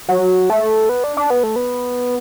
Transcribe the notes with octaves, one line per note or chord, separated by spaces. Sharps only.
F#3
A3
B3
D4
D4
B3
A3
B3